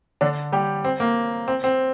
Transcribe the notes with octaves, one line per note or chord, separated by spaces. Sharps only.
D3 D4
G3 G4
C4
A#3
C4
C4